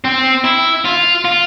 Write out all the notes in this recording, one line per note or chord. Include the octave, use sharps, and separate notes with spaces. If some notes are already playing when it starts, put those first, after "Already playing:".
C4
E4
F4
F4